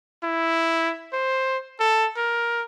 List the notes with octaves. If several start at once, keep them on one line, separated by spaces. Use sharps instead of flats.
E4
C5
A4
A#4